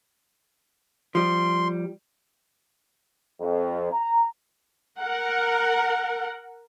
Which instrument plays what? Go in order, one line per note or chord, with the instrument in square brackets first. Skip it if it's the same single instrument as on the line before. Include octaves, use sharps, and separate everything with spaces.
[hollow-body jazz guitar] F3 G3 [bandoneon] C6
[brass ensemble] F2
A#5
[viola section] A#4 F#5